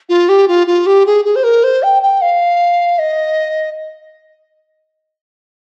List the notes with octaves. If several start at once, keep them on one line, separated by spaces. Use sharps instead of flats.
F4
G4
F4
F4
G4
G#4
G#4
C5
A#4
C5
G5
G5
F5
D#5